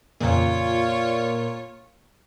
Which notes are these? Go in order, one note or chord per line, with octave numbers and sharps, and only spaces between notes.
F2 A#2 C#3 F4 G#4 C#5